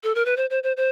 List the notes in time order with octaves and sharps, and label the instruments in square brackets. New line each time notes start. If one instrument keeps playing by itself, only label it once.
[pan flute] A4
A#4
B4
C5
C5
C5
C5